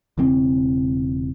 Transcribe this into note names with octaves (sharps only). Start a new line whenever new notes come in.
E1 C#3 E3 C4